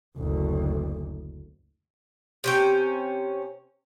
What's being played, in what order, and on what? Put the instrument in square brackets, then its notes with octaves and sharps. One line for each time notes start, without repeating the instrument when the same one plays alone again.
[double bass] F#1 D2
[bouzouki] C3 C#4 G5